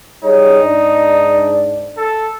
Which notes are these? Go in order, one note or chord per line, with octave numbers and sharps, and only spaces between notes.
G3 D#4 G#4 C#5
G#2 D4 D5
A4